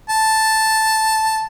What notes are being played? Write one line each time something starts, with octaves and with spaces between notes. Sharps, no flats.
A5